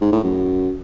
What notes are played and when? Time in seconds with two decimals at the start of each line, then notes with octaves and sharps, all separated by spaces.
0.01 G#2
0.12 A2
0.23 F#2